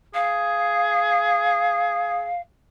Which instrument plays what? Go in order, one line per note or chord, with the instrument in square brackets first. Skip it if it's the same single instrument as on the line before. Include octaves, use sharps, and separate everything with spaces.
[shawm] G#4 [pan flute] F5